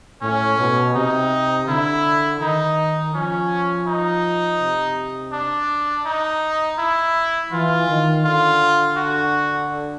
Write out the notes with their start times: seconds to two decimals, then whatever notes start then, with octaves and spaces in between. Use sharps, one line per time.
0.22 A2 C#4
0.58 B2
0.95 C3 D#4
1.68 D3 E4
2.41 D#3 D#4
3.14 F3 C#4
3.87 D#4
4.60 C3
5.33 D4
6.06 D#4
6.78 E4
7.52 E3 F4
7.88 D#3
8.24 D3 F4
8.97 F#4